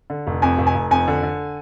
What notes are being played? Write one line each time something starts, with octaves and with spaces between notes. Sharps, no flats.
D3
F1
F2 G#5
F1
G#5
F1
F2 G#5
D3
D3